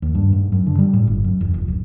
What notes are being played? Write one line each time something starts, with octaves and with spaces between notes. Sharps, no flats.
D#2
G2
G#2
F#2
D3
G3
A2
G1
F#2
E1
F1
D1